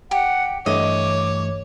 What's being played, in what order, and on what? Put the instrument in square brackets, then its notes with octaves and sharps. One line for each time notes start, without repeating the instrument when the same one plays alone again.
[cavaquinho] G4 [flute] F#5
[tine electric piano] G2 E3 A3 [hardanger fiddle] C#5 [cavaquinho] D#5 [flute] D6